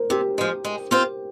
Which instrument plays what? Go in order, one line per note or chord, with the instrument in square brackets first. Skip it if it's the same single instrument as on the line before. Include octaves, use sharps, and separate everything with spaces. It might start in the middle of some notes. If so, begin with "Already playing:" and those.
Already playing: [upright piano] A#4 C5
[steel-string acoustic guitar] C3 [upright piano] G4
[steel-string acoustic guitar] F3 G#3
G#3
C4 F4 C5